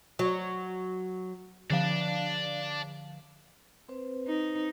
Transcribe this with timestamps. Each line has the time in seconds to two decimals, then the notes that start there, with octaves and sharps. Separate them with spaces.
0.19 F#3
1.70 D3 F3 D5 F5 A5
3.88 C4 B4 C5
4.27 D#4